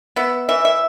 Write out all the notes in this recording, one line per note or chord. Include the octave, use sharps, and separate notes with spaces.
B3 E5
E3 E5
E5